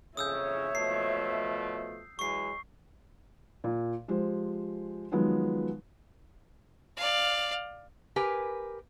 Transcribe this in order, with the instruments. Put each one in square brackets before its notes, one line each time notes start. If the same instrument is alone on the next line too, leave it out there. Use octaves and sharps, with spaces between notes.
[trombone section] F2 C#3 [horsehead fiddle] C#5 E5 [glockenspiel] D#6 E6 G6
[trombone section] B2 F3 A3 [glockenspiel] C7
[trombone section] E3 F#3 G#3 [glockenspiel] C#6 C7
[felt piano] A#2
F3 G#3 G4 C5
D#3 F3 F#3 G#3 B3
[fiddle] D5 F5
[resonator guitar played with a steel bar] G4 A#4 B4 G#5